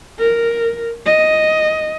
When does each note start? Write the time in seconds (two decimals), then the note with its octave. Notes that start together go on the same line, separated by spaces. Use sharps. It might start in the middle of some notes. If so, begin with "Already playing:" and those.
0.19 A#4
1.06 D#5